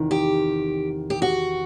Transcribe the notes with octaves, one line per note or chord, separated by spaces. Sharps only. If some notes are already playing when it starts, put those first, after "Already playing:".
Already playing: E2 C3 D#3
G4
G4
F#4